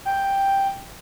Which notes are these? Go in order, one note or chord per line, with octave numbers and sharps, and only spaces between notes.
G5